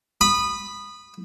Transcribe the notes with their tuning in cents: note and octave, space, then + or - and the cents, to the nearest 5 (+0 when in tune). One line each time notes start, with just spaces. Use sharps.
B5 +0 D#6 -20